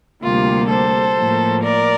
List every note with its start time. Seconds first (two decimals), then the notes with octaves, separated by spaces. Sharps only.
0.23 D2 C3 G3 A#3 F4
0.70 A4 C5
1.17 A2 F3 A#3
1.63 A#4 D5